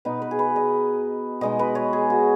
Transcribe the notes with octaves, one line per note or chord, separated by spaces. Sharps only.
B2 B3 D#4 B4
B4
G#4
B4
D#5
B2 G#3 D#4 D#5
B4
C#5
G#4
F#4